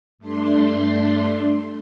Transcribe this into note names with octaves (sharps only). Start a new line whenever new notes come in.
G2 A3 D4 C6